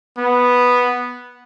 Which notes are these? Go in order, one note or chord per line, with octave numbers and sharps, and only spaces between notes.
B3